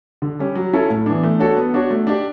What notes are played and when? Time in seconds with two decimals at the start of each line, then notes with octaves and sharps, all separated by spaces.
0.22 D3
0.39 G3 C#4 G4
0.55 F#3
0.73 C#4 E4 A4 C#5
0.90 A2
1.06 E3 B3 D4
1.23 A3
1.39 D4 F#4 A4 C#5
1.57 B3
1.74 D4 F#4 C#5
1.90 A3
2.07 D4 G4 D5